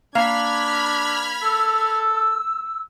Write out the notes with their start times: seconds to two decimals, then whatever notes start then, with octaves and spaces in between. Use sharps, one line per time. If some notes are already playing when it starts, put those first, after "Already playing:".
0.15 A#3 D4 F5 B5 F6 G#6
1.43 A4 E6